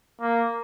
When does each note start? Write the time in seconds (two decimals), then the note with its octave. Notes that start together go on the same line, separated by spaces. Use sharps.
0.21 A#3